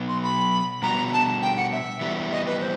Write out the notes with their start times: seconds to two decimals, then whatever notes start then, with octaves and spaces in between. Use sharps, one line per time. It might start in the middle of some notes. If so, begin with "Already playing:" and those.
Already playing: B2 F#3 B3
0.08 C6
0.23 B5
0.82 B2 G3 B3 D4 F#4 A#5
1.13 A5
1.42 G5
1.57 F#5
1.72 E5
2.01 E3 G3 B3
2.31 D#5
2.46 B4
2.61 C5